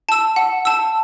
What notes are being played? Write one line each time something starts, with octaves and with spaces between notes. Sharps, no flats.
A5 E6
F#5
A5 E6